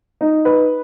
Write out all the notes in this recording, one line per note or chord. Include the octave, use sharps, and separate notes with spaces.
D#4
B4